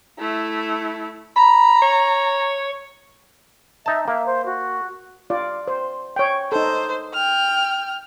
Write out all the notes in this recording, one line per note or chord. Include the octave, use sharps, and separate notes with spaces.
A3 E4
A#5 B5
C#5
D#4 E5 A5
A#3 E5
C5
F#4
F4 D5
C5
C#5 G5
D#4 A4 C5
G5 F6